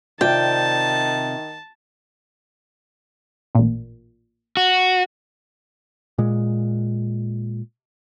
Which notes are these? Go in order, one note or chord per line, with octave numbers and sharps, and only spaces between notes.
C3 D#3 F4 D5 G5 A5
A1 A#2
F#4
A#2 G#3